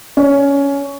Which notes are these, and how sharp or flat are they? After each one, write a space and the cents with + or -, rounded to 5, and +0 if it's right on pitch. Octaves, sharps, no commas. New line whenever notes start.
C#4 +15